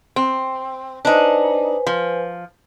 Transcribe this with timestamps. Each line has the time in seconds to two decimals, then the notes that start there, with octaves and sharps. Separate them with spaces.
0.16 C4
1.05 D4 D#4 B4 C5 G#5
1.87 F3